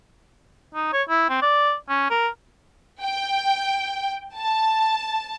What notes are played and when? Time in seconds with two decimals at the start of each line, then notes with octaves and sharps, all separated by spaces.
0.75 D#4
0.93 C#5
1.09 E4
1.29 C4
1.42 D5
1.89 C#4
2.10 A#4
3.01 G5
4.36 A5